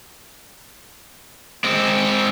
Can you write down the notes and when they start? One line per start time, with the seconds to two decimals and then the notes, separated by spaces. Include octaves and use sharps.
1.64 G#3 C4